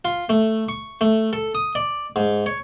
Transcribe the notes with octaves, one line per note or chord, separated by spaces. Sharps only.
F4
A3
C#6
A3
A4
D#6
D5
G#2
C#5